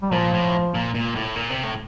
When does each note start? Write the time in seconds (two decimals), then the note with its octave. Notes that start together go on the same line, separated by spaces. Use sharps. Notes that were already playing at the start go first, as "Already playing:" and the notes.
0.02 G3
0.12 A#2 F3
0.33 A2
0.74 A#2
0.95 A#2
1.16 A2
1.36 A#2
1.50 C3
1.64 A2